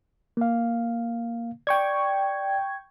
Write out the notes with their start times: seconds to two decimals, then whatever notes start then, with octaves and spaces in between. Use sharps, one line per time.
0.37 A#3 F5
1.67 D5 G5 C#6 G#6